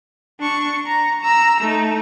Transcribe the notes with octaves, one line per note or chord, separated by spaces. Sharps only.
D4 C#6
A#5
A#5 E6
A3 D#4